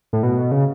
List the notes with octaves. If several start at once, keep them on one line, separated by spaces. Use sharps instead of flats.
A2
B2
C#3